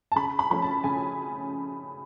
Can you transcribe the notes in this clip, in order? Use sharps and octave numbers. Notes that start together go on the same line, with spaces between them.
A5
C#3 B5
B5
F3 A3 C#4 B5
A5
C#3 G#5